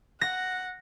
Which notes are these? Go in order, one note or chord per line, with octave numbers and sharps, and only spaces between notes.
F#5 A#6